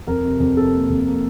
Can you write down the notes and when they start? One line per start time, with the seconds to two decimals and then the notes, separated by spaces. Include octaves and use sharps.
0.07 F2 A#4
0.24 C3
0.40 F2
0.57 C3 A4
0.73 A#3
0.90 F2
1.07 A#3